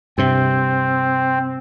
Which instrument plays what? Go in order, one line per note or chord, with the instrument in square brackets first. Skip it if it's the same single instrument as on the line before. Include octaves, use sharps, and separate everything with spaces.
[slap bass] G2 C3 [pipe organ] C4